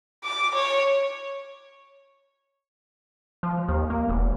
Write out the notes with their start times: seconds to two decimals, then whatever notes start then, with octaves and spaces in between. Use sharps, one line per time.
0.24 D6
0.55 C#5
3.43 F3
3.68 D#2
3.90 A#3
4.09 E1